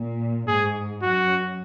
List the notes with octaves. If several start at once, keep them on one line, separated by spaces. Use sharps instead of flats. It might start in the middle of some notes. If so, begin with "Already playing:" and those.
Already playing: A#2
G#2 G#4
F#2 F#4